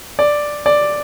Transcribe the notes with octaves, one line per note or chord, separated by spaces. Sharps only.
D5
D5